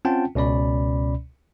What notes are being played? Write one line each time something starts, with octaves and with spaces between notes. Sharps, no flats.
C4 C#4 F4 F#5 G5 A5
C#2 B2 C#4 D5 B5